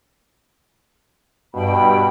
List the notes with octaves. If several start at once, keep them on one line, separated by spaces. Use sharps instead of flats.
G2 B2 G5 B5